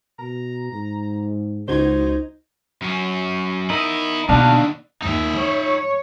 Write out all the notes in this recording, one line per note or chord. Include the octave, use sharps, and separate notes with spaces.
B2 A#5
G#2
C#2 D#4 F#4 C5 G#6
F#2 C#4
B3 D#4 E4 A#4 D#5
D#2 B2 D3 D4 F#4 F5
D#2 D#4 E5
C#5